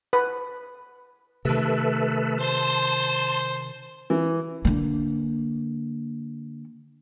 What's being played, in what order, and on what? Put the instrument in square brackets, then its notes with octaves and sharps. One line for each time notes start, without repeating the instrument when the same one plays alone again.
[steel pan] B4
[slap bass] C3 D#3 [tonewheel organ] A3 A4 B4
[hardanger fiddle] C5 [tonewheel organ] A5 C6
[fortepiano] E3
[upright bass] D3 A#3